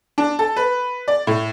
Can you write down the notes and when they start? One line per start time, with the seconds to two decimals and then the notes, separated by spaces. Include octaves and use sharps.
0.18 D4
0.39 A4
0.56 B4
1.08 D5
1.27 A2